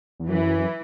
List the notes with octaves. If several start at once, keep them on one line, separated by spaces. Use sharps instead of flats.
E2
F#2 E3